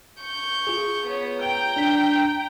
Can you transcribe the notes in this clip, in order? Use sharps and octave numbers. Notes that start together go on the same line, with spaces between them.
C#6 G6
F4 G#4
B3 C#5
G5 A#5
D4 B6